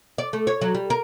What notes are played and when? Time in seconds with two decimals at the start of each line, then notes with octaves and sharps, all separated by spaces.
0.18 D5
0.33 A3
0.47 C#5
0.61 F#3
0.75 G3
0.90 A#4